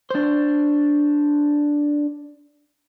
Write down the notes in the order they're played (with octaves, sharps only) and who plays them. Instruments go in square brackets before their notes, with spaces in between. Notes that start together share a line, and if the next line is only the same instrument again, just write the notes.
[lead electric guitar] D4 C5